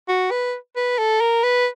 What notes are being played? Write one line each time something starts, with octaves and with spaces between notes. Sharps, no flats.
F#4
B4
B4
A4
A#4
B4